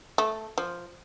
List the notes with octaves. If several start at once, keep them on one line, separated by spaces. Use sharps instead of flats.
A3
F3